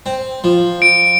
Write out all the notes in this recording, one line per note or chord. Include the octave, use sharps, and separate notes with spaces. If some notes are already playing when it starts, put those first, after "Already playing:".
C4
F3
D7